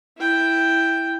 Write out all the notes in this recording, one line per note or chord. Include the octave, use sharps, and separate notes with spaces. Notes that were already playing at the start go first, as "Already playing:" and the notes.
E4 G5